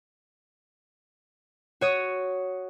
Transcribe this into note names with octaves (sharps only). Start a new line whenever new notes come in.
F#4 C#5 D#6